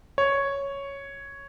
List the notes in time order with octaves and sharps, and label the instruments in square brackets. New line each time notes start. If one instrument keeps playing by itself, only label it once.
[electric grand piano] C#5